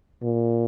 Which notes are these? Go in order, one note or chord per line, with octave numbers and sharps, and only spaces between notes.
A#2